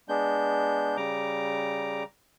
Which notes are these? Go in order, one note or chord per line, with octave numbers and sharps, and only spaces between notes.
G#3 B3 D4 G6
C#3 G3 A#5 D6